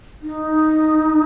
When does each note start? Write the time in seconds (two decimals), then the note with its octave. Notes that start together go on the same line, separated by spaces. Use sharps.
0.22 D#4